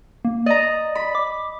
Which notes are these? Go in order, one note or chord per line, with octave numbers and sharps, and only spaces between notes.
A#3
D5 D#5 A#5
B5
D6